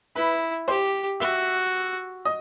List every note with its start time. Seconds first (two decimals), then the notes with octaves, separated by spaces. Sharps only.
0.16 E4 B4 B5
0.68 G4 C5 C6
1.20 F#4 E5 E6
2.25 D#5 D#6